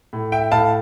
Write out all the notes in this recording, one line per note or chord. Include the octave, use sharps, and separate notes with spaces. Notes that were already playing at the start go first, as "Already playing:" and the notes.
A2
E5 G5
A2 F5 A5